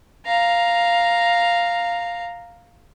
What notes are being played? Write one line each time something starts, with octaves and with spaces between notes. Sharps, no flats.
F5 A#5